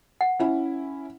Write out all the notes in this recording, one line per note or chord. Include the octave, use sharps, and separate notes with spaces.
F#5
C#4 E4